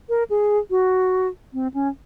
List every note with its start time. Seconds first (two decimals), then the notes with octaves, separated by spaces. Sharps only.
0.09 A#4
0.30 G#4
0.70 F#4
1.53 C4
1.74 C#4